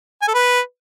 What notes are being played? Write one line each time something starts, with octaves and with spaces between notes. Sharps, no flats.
G#5
A4
B4